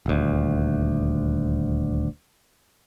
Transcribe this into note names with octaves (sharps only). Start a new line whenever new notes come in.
D#1 D2